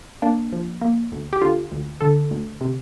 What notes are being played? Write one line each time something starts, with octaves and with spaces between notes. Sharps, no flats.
A#3 D4
F3
A#3
D2
G4
D3 F4
D2
D3 A4
D2
C3